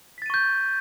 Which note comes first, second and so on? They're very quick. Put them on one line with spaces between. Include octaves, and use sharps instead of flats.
B6 A6 D#7 C#6 G6